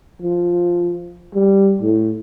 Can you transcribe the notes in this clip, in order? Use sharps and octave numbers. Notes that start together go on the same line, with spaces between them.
F3
G3
A2